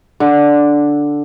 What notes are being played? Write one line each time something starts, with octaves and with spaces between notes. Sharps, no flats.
D3